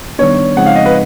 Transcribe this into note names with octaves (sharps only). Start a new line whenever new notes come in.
D#3 G3 B3 D4 C#5
C#3 F3 G#3 C4 D#4 F#5
F5
D#5
B4